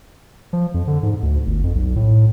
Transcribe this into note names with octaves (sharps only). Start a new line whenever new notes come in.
F3
F2
D3
G#2
D2
G1
F2
B1
A2